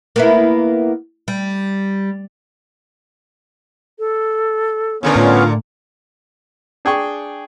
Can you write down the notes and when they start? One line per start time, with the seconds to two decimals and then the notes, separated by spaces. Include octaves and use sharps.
0.16 A#3 B3 E4
1.28 G3
3.99 A4
5.03 A#2 D3 B3 C#4 A#4
5.16 A2 F4
6.85 D4 G#4 G5 C#6